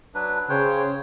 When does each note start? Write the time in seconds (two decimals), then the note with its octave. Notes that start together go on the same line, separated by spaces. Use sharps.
0.14 F#3 D4 B4
0.49 C#3 C5 C#5 G5